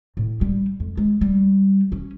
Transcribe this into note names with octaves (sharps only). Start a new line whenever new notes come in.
A2
G3
F2
G#3
G3
C#4